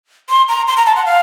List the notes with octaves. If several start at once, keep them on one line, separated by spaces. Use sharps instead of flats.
C6
A#5
C6
A#5
A5
F#5
F5